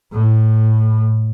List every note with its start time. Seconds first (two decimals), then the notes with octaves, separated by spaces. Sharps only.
0.13 A2